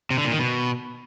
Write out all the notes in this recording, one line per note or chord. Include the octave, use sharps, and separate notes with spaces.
C3
D3
A#2
D#3
B2